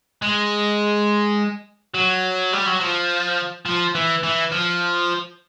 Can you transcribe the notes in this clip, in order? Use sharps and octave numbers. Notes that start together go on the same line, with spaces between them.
G#3
F#3
G3
F#3
F3
F3
E3
E3
F3